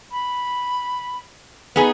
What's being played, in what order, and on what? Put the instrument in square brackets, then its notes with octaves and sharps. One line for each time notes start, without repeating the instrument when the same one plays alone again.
[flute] B5
[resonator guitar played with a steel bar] B3 D#4 G#4 [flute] B4